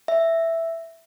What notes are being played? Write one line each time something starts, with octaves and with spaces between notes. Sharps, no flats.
E5